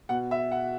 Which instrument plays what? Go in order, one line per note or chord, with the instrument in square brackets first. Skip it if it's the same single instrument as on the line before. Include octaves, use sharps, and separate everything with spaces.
[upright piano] B2 F#5
E5
F#5